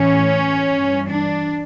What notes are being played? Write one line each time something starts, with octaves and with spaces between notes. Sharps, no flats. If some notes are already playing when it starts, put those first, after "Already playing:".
Already playing: A2 E3 C#4
G2 E3
D4